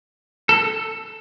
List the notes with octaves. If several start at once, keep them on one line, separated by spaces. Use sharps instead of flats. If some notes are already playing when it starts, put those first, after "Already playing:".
A4